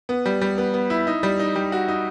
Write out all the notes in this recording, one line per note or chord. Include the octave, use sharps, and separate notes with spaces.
B3
G3
G3
B3
B3
E4
D#4
G3
D#4
G3
F#4
D#4